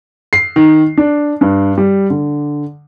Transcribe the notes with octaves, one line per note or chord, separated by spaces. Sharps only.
C7
D#3
D4
G2
G3
D3